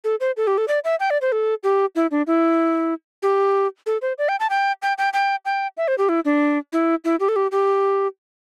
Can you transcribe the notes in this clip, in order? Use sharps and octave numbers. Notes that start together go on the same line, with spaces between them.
A4
C5
A4
G4
A4
D5
E5
G5
D5
C5
A4
G4
E4
D4
E4
G4
A4
C5
D5
G5
A5
G5
G5
G5
G5
G5
E5
C5
G4
E4
D4
E4
E4
G4
A4
G4
G4